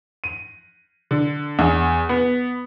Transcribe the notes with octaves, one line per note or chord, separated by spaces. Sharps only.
D#7
D3
E2
B3